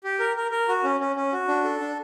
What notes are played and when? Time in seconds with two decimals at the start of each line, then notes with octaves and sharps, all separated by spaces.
0.04 G4
0.19 A#4
0.36 A#4
0.51 A#4
0.68 F#4
0.84 C#4
1.00 C#4
1.16 C#4
1.33 F#4
1.48 D4
1.64 A4
1.80 D4